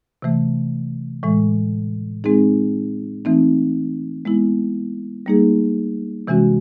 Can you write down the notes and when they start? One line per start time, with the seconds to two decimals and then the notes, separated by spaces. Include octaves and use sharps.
0.22 C3 E3 A3
1.23 A2 E3 G#3
2.24 G#3 C4 D#4 G#4
3.25 E3 A3 C4 D#4
4.25 G#3 B3 E4
5.26 G3 A#3 D#4 G#4
6.27 C3 E3 G#3 C#4 F#4